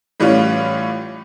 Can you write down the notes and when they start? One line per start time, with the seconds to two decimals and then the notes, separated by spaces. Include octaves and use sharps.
0.20 A2 E3 G3 C#4 F4